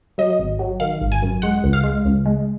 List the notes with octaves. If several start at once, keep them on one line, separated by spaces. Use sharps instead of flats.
F#3 D#5
G#1
F#3
D#3 F5
G#1
G#5
F#2
G#3 F#5
C#2
F5
G#3
C#2
G#3